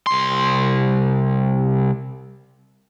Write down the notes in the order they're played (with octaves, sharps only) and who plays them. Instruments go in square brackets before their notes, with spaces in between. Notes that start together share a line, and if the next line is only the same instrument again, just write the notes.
[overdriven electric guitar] C2 C6